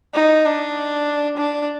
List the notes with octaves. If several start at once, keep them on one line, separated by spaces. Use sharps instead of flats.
D#4
D4
D4